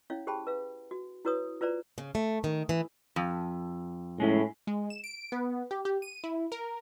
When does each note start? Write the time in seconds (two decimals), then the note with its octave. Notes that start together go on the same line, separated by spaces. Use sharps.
0.10 C#4 E4 C#5 F5
0.27 G4 G#4 C5 G5 A5 B5
0.47 B4 F5
0.91 F#4
1.25 E4 F#4 B4 C#5 D#6
1.61 F4 B4 C5 D5 A#5
1.98 C#3
2.15 A3
2.44 D#3
2.69 E3
3.16 F2
4.20 A2 G#3 C#4 E4
4.67 G#3
4.90 E7
5.04 D7
5.32 B3
5.71 G4
5.85 G4
6.02 D#7
6.24 E4
6.52 A#4